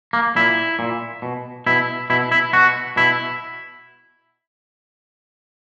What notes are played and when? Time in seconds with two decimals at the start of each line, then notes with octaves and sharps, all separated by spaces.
0.13 A#3
0.36 A#2 E4
0.79 A#2
1.22 B2
1.66 B2 E4
2.10 B2 E4
2.32 E4
2.53 B2 F#4
2.96 B2 E4